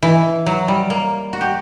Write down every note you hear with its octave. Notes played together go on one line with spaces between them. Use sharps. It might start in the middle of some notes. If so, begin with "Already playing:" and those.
E3
F#3
G3
A#3
F#4
G4